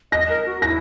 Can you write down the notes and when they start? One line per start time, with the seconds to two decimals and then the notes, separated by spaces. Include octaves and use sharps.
0.12 D#5 A#6
0.29 A#4
0.46 F#4
0.62 E4 A#6